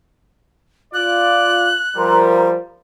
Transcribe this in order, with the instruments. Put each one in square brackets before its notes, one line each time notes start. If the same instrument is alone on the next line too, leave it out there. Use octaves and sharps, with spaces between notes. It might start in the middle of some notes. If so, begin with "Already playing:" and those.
[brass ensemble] F4 D5 [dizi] F#6
[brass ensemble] F3 G3 [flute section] A#4 A#5 C6